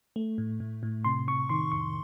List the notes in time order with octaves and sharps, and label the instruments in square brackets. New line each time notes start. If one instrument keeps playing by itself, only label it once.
[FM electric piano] A3
A2
A2
A2
C3 C6
C3 C#6
D#3 C6
F2 C#6